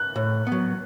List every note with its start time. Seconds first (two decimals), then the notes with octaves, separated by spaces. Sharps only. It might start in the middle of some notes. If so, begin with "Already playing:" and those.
Already playing: F#6
0.16 A2
0.47 B3
0.52 F#3